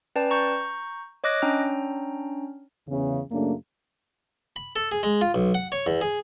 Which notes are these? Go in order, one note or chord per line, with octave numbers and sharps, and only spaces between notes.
C#4 B4 D5 G5 A5
A#5 C#6 G6
C#5 D#5 D6 F#6 A#6
C#4 D4 C#5 G5 A#5 F6
E2 C#3
F#2 C#3 A3 A#3 D4
B5
A4
G#4
G#3
F4
B1
F#5
C#5
E2
G#4